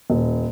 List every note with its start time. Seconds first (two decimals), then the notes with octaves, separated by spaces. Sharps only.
0.10 D#1